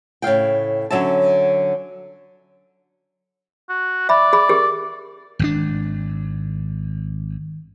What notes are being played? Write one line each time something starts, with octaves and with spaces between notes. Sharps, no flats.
A2 C#3 F5 G5
D3 F#3 C#4 E5 A5
F#4
D5 E5 B5
G#4 B5
G4 G#4 A#4
G#1 C#3 D4